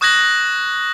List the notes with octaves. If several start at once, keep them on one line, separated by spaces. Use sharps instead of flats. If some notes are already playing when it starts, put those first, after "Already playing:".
C#6 D#6 F#6 G#6 A#6 F#7